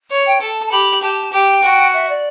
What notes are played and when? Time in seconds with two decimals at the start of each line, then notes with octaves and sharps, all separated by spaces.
0.10 C#5
0.26 G5
0.41 A4 A5
0.66 A5
0.71 G4 B5
1.02 G4 A5
1.32 G4 G5
1.63 F#4
1.93 E5
2.09 D5